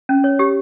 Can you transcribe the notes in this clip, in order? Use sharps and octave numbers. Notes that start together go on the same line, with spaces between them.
C#4
C#5
G4